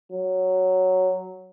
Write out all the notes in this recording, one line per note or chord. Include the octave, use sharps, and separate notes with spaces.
F#3